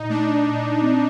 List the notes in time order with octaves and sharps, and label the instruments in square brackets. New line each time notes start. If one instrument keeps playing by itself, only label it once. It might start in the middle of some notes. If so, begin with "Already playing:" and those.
Already playing: [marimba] A#2 [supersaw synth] D#4
[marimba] A3 [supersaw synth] D4
[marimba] A#2
C4